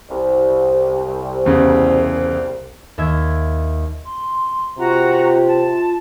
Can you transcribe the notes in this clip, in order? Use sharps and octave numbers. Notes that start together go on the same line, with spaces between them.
C2
E2 C#3
D#2 E5 G#6
C6
C3 F4 F#4 A#5
A5